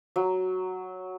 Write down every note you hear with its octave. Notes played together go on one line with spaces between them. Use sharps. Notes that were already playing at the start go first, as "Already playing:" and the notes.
F#3